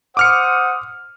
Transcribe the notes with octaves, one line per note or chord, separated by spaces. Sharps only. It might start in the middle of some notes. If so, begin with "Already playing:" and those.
C5 F#5 D6 D#6 F6 C#7